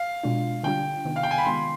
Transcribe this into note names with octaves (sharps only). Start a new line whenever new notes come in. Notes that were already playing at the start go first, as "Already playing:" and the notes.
Already playing: F5
B2 G#3 D4 F4
D3 G3 D4 F4 G5
C3 D#3 B3
F5
G5
G#5
B5
D#3 G#3 B3 F4 C6